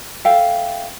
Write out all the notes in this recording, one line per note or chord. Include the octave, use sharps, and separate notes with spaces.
A4 E5 F5 G5